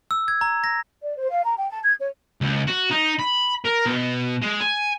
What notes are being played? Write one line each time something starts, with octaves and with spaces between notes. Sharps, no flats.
E6
G#6
A#5
A#6
D5
C5
F5
A#5
G5
A5
G#6
C#5
C#2
F#4
D#4
B5
A#4
B2
G#3
G#5